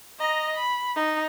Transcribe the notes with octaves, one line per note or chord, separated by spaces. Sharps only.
D#5 A#5
B5
D#4